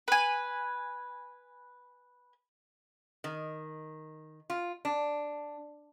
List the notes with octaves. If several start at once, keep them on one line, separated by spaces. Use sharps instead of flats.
B4 G#5
D#3
F4
D4